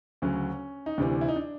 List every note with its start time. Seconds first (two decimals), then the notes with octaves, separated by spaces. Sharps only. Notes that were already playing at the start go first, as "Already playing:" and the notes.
0.22 D2 C#3 F#3 C#4
0.86 D#4
0.98 D2 C3 E3 D4
1.21 E4
1.28 D#4
1.36 D4